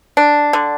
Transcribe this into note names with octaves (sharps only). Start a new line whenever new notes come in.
D4
D3